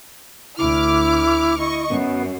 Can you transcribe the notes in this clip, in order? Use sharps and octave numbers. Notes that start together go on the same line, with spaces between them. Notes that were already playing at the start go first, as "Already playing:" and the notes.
D2 E4 D6 F6
E4 D#5 C#6
F#2 B3